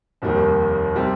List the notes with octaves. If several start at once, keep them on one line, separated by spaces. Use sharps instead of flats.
F1 D#2 D#3 G3
C3 G3 C4